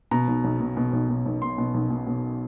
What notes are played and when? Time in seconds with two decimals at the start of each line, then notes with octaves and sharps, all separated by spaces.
0.11 B2 A#5
0.28 B1
0.44 B1
0.60 B2
0.77 B2
0.93 B1
1.09 B2
1.26 B1
1.42 B2 C6
1.58 B2
1.74 B1
1.90 B2
2.07 B2